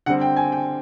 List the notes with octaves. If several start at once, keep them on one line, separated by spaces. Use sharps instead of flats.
D3 G3 C4 F#5
G5
G#5
G5